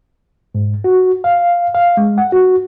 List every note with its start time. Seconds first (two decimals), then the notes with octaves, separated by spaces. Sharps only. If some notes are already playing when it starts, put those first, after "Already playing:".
0.55 G#2
0.84 F#4
1.24 F5
1.75 F5
1.97 G#3
2.18 F#5
2.32 F#4